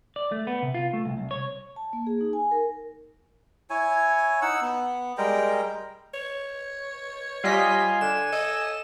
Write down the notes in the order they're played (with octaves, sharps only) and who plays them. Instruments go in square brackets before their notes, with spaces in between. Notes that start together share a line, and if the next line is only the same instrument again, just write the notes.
[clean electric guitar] D5
A3
B3
C3
F4
A3
C2
C2
C#5
[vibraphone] A5
A#3
G#4
D#4
G#5
A#4
[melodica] E4 C#5 G#5
D#4 F#5 E6
B3
G3 G#3 A#4 G5
[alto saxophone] C#5
[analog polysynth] G3 D#5 B6 [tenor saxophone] F4 [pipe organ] G#5
[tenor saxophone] D3 [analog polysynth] E7
[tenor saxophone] A4 [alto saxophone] D#5